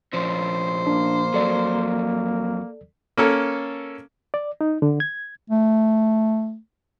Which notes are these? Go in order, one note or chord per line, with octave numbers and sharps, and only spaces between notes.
A#2 F3 C#4 C5
A#3 D4
F2 F#3 A4 D5
A#3 C#4 A4
D5
D#4
D3
G#6
A3